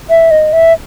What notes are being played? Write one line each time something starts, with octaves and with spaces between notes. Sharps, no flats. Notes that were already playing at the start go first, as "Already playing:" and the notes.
E5
D#5
E5